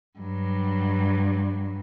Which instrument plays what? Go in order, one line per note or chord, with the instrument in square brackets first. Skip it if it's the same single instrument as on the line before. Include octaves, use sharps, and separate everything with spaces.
[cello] G2 F#3